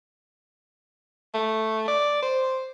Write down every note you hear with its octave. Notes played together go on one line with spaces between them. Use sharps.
A3
D5
C5